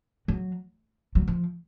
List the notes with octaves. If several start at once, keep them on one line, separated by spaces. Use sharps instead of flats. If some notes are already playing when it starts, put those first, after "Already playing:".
F#3
F#3
F3